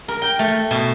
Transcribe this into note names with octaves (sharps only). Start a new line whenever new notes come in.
A#4
G5
A3
B2